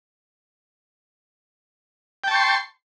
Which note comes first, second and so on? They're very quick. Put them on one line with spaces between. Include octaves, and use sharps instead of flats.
G5 A5 C#6 C6